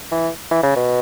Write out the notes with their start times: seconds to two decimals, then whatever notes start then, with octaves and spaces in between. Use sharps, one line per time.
0.12 E3
0.51 E3
0.63 C#3
0.76 B2